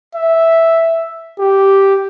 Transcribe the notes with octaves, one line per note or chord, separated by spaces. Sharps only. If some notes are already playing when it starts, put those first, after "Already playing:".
E5
G4